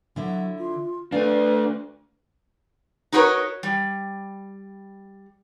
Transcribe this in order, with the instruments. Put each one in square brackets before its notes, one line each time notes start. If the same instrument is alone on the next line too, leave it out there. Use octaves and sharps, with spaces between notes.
[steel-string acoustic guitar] D3 E4 E5 [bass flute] F#3
[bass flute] F4
[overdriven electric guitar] A3 D4 [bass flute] B4 [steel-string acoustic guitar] F5
[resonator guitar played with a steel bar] D#4 F#4 A#4 B4 C#5
G3